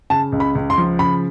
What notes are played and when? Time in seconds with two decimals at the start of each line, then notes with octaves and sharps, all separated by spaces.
0.10 C#3 A5
0.32 C#2
0.40 B5
0.55 C#2
0.70 C6
0.78 F3
0.99 C#3 B5